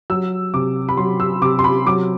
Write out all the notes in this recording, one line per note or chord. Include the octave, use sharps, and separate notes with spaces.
F#3 E6
C3 D6
B5
F#3 C6
E6
C3 D6
C6
B5
F#3 D6